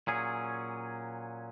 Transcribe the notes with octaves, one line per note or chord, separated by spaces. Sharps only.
A#2 F#3 C#4 G#4